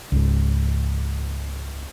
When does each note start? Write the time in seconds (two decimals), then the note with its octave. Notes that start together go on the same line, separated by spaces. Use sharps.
0.12 C#2 G#2